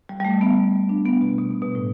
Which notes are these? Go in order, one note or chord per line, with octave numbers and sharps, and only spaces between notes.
G3
G3
A3
B3
D4
B3
B2
B2
B2
B2
A2